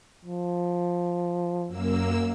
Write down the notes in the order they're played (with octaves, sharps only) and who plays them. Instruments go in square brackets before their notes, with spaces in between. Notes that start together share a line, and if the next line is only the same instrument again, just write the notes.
[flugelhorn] F3
[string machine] F#2 A#3 E6